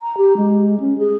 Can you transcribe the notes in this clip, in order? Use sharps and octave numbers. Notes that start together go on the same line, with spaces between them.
A#5
G4
G#3
C#4
G#4